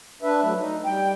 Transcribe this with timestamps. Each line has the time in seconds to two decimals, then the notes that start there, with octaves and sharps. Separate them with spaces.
0.23 D4 B4 E5
0.43 F#3 A3
0.58 D#4
0.85 G3 G5